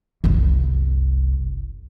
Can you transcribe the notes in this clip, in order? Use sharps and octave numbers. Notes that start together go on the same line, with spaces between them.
F#1 C2